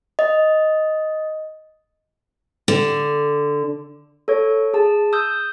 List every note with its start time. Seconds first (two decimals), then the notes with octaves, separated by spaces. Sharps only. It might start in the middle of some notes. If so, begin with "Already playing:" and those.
0.19 D#5
2.68 D3
4.28 A4 C#5
4.74 G#4 A5
5.13 D#6 E6 G6